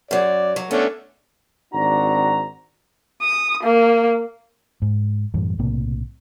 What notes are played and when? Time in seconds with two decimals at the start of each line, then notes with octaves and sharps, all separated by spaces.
0.11 F#2 F#3 D5
0.56 F#3
0.71 A3 B3 C#4 D4
1.74 G#1 C4 D4 F#4 A#5
3.22 D#6
3.64 A#3
4.82 G#2
5.34 F#2 A2 E3 G3
5.59 B1 A2 C3 A#3